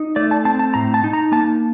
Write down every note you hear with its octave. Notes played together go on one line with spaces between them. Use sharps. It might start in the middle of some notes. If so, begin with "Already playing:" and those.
Already playing: D#4
A3 D5
A5
C4 A5
A5
A2 A#5
A5
D#4
A#5
A#3 A5